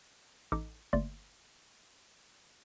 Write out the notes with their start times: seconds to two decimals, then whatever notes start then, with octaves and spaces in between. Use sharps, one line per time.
0.52 A1 D#4 A4 D#5 D6
0.93 G1 A3 A#3 D5 C6